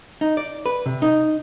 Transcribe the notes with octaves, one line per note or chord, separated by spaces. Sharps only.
D#4
D5
B4
C3
D#4